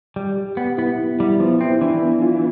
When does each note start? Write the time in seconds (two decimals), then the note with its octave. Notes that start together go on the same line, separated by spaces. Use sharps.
0.16 G3 G4
0.37 G4
0.57 B3 G4
0.78 B3 E4
0.99 B3
1.19 G3 E4
1.40 F3 B3
1.61 C4 E4
1.81 E3 D4
2.02 B3
2.22 F4